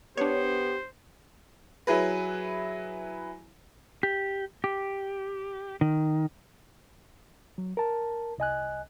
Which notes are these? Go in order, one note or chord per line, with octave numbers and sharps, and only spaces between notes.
B3 D4 G4 C5 C#5
F#3 E4 G#4 B4
G4
G4
D#3
F#3
A#4 A5
C2 D#5 G#5 F#6